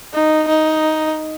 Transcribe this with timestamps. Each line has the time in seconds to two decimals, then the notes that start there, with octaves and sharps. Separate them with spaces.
0.14 D#4
0.48 D#4